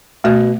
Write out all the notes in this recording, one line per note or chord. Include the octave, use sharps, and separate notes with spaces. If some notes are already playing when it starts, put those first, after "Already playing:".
B2 A3